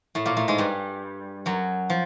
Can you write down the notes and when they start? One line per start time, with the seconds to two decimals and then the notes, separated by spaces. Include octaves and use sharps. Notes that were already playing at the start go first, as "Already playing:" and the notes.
0.15 A2 A3
0.26 A#2 A#3
0.37 A2 A3
0.48 G#2 G#3
0.58 G2 G3
1.46 F#2 F#3
1.90 F3